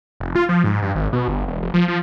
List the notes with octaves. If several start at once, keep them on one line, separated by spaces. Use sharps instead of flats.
F1
F4
F3
G#2
G2
G#1
B2
G1
E1
F1
F3
F3